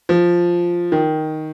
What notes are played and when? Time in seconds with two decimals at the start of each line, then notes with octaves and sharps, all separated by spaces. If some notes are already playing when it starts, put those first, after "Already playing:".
0.09 F3
0.92 D#3